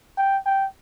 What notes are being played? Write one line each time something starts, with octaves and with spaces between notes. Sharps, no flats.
G5
G5